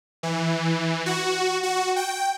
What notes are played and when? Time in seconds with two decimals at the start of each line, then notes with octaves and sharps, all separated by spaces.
0.23 E3
1.06 F#4
1.63 F#4
1.96 G5